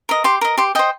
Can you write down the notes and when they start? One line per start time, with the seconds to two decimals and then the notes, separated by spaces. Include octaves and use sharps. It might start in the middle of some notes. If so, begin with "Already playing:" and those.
0.09 A#4 D#5
0.24 G4 C6
0.41 A#4 D#5
0.58 G4 C6
0.75 C5 D#5 G5